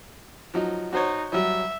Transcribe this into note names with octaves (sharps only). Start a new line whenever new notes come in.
F3 F#3 D#4
D#4 F#4 C5 C#5
F#3 G3 E5